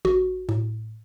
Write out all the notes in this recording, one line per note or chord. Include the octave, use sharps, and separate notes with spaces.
A1 F#4
A2